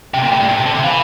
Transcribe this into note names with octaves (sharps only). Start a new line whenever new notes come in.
C3 G5
A#2
A2
G2
A2
C3
D3
C3
E3 F5